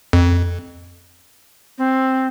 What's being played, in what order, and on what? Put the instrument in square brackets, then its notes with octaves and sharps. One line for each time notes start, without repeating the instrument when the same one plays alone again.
[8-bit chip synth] F2
[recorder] C4